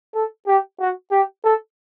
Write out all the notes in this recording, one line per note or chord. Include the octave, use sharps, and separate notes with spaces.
A4
G4
F#4
G4
A4